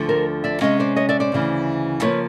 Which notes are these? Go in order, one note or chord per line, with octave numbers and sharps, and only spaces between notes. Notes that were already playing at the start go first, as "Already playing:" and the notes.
Already playing: D2 D3 F3 A3
A#4 C5
D5 E5
C3 D#3 G#3 C#4 D#5 F5
C5 D5
C#5 D#5
D5 E5
C5 D5
D2 C#3 E3
C#3 F3 A#3 B4 C#5